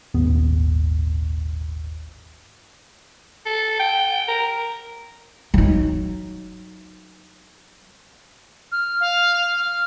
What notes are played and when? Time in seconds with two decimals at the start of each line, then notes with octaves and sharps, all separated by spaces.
0.15 D#1 G#1 D#2 B3
3.46 A4
3.79 G5
4.28 A#4
5.54 F#3 D#4
8.72 F6
9.00 F5
9.59 F6